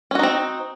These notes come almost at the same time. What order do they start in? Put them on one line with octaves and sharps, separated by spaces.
C#4 F#4 D#4 C4